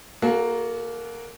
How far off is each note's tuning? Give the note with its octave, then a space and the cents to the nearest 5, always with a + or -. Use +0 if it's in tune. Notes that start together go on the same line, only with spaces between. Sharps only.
A#3 +0 F#4 +0 A4 -45